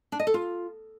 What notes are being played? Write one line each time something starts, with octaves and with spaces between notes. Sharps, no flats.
D4
D#5
A4
F4